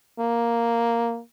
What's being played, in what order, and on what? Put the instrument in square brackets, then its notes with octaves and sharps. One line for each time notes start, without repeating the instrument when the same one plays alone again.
[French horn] A#3